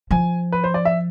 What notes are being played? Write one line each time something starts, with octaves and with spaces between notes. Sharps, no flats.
F3 G#5
B4
C5
D5
E5